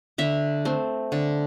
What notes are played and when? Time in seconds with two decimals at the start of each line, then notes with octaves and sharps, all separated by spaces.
0.18 D3 E5
0.65 A3 C4
1.12 D3